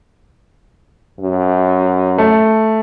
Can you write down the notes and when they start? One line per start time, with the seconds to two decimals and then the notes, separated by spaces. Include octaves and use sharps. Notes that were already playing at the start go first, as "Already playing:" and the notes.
1.20 F#2
2.18 A3